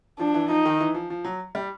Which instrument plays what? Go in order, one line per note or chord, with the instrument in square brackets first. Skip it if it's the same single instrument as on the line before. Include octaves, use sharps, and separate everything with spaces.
[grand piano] F3 [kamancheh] D4
[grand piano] E3
[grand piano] F3 [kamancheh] D#4
[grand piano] D#3
E3
F3
F3
F#3
G3